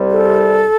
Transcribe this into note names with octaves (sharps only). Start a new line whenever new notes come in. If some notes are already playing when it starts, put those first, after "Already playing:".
Already playing: C2 C3 G3
A4